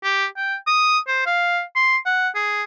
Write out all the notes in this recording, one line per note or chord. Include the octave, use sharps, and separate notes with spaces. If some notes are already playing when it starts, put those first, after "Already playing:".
G4
G5
D#6
C5
F5
C6
F#5
G#4